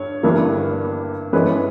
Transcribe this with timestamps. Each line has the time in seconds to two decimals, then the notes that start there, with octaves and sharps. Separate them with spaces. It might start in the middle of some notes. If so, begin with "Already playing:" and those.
Already playing: G2 C#5
0.23 G1 G2 E3 G3 A#3
1.33 G2 E3 G#3 C#4 G#4 B4